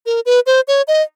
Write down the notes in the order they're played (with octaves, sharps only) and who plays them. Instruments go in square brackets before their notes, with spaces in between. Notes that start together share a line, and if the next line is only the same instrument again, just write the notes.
[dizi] A#4
B4
C5
C#5
D#5